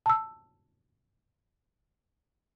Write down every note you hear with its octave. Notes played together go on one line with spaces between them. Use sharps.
A5 E6